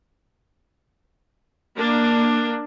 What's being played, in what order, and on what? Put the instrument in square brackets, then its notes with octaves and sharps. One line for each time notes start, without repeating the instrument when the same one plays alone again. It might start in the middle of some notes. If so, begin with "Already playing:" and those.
[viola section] A#3 D4